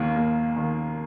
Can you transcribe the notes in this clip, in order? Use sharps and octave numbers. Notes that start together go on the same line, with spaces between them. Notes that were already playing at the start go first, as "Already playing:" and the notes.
Already playing: D#2 D#3 A#3
D#2
D#3